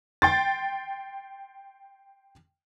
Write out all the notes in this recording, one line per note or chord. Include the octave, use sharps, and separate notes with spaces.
G5 C6 A6